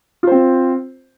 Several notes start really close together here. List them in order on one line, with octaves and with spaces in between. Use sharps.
F4 C5 C4